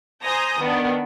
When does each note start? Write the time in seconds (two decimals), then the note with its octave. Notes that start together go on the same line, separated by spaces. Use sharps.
0.25 C5 G#5 A#5 D#6 G6 A#6
0.59 D#3 B3 D4